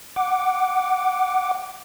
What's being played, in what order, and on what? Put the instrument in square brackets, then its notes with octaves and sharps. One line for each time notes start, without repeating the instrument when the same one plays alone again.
[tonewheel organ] F#5 D6